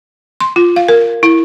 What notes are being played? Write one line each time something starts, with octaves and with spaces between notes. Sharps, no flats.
C6
F4
F5
A#4
E4